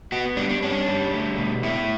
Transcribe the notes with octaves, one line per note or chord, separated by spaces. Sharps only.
B3 F#4
G3 D4
D4
C#4 D4
G3
A3
B2
A3 E4